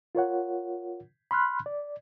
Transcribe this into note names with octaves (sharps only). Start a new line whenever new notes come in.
F4 A#4 C#5 F#5
B5 C6 F6 F#6
D5